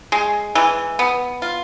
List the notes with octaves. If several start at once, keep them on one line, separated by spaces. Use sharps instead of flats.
G#3
E3
B3
F4